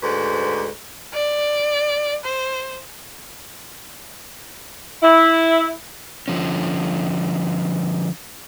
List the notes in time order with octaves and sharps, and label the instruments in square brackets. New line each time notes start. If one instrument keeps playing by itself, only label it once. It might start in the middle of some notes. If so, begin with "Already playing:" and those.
[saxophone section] D2 G#2 B4
[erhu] D5
C5
[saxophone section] E4
[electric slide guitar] D3 F3 C#4